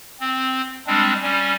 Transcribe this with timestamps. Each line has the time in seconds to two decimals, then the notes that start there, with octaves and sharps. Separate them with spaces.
0.20 C4
0.87 G3 G#3 C4 D4
1.23 G3 C#4